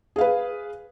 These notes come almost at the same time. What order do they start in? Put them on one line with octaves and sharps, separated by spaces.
G#4 F5 B4